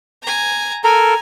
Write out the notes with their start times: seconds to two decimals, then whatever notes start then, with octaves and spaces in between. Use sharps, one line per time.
0.23 G#5 A#5
0.84 A4 A#4 G#5 A#5